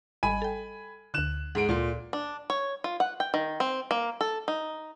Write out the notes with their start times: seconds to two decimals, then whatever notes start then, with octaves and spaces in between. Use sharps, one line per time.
0.23 G#1 G3 D#5 G#5 B5 D#7
0.42 A4 G5
1.14 D2 D3 F#6 E7
1.55 G#2 G#3 F#5 D7
1.69 D2 A#2 A4 C6
2.13 D4
2.50 C#5
2.84 F4
3.00 F#5
3.20 G5
3.34 D#3
3.60 C4
3.91 A#3
4.21 A4
4.48 D#4